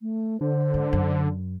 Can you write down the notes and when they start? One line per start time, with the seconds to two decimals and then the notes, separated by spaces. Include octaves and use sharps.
0.01 A3
0.41 D3 C5
0.74 G#2
0.93 F#2